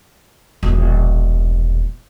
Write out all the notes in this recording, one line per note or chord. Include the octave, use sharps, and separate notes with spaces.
E1 A#1